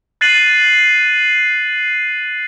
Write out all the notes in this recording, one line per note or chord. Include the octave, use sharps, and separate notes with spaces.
F#6 A6 C7 D#7 F#7